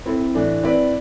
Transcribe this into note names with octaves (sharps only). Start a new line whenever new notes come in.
C4 E4 A4
A2 E3 A3 D4
C4 E4 B4 D5